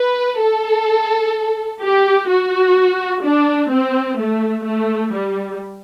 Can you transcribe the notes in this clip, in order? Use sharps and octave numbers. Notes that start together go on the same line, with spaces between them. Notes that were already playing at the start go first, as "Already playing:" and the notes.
Already playing: B4
A4
G4
F#4
D4
C4
A3
A3
G3